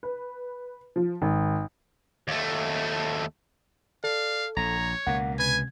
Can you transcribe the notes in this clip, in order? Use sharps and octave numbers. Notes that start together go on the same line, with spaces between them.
B4
F3
G#1
D#2 A3
A4 D5 F5
A#1 C#5 A#5
C#2 B2 A#3 F#5
C3 B4 G#5 G#6